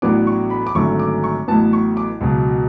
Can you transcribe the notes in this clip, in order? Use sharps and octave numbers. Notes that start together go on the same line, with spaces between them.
A1 A2 F#3 B3 D4 D6
C#6
B5
D6
G#1 F#2 D3 F#3 A3 C#6
D6
C#6
A1 A2 F#3 B3 A5
C#6
D6
C#2 B2 F#3